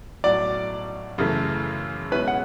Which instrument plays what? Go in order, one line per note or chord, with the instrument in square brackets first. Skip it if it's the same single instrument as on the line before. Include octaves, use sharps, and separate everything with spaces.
[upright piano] B1 A2 F#3 [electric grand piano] D5 D6
[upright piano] F#2 C#3 E3 A3
[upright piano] B2 G#3 C#4 E4 [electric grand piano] B4 B5
[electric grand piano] F#5